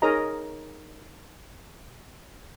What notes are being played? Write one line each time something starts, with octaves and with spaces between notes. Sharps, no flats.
D#4 G#4 A#4 C#5 D#5 A#5